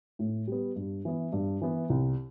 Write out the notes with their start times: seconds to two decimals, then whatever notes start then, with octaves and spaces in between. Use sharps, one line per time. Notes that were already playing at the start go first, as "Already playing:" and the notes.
0.19 A2
0.48 G3 B3
0.76 G2
1.05 E3 B3
1.33 G2
1.62 E3 B3
1.90 C2